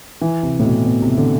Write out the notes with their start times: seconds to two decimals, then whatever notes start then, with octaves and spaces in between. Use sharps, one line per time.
0.21 E3
0.43 C3
0.59 A2
0.65 B2
0.86 B2
1.02 C3
1.18 D3